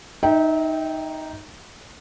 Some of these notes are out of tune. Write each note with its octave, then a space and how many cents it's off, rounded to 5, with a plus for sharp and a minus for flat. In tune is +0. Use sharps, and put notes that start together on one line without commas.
D#4 +0 E5 -35 G5 +0